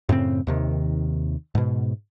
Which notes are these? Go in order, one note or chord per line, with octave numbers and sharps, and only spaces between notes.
F#2 A2 C#3 C4
D#2 C3 D#3
G#2 B2